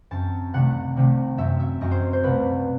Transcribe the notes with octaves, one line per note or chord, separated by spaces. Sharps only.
F#2 F#3 C4 A5
C2 C3 D#3 A3 F#5
C2 C3 D#3 A3
F#2 F#3 C4 E5
E5
F#2 F#3 C4 D#5
C5
C5
C2 B2 A3 B4